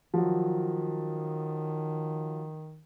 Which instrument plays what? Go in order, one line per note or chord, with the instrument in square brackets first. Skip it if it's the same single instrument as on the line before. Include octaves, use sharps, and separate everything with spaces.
[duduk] D#3 [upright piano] F3 F#3